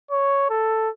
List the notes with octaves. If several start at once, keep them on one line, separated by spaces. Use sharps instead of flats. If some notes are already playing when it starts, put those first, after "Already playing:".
C#5
A4